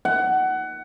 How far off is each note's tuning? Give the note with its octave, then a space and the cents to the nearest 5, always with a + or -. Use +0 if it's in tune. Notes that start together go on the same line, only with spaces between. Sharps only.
F#5 +20